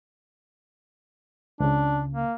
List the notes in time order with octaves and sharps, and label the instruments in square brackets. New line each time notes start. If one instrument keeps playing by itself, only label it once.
[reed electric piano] C#2 C#3 [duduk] D4
[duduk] A#3